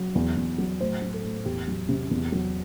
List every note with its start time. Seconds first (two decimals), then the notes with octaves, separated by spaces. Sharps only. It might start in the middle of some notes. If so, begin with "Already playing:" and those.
Already playing: F#3
0.15 E2
0.37 E2
0.58 F#3
0.80 A2 C5
1.02 F#3
1.13 A4
1.24 A2
1.45 E2 G4
1.67 F#3
1.89 C3
2.11 E2
2.32 F#3